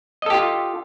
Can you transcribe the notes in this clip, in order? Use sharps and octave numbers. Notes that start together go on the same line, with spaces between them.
F4 G4 A4 D#5